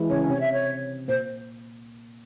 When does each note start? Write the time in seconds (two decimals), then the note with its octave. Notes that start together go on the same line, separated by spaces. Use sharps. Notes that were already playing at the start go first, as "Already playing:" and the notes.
Already playing: E3 G#3 E4 G#4
0.10 C#3 C#4 C#5
0.24 C#4
0.29 C3 C4 C#5
0.41 E5
0.53 C#5
1.08 A#2 A#3 C5